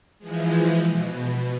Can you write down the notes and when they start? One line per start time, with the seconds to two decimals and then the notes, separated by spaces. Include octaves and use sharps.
0.18 E3 F3 G#3
0.87 B2